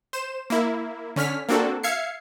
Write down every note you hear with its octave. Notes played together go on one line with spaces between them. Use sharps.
C5 E7
A#3 E4
D3 C#4 F6 B6
A#3 C4 D4 F#4 A4
E5 F5 G#6 C7 C#7